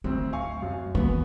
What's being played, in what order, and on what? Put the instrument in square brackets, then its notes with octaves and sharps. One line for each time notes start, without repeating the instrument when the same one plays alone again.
[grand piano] D2 C4 [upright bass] F#3
[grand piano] F5 G#5 C#6
F#2
[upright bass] E3 A#3 [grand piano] B3